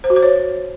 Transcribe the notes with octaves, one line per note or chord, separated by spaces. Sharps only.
C5
F#4
C5
C#5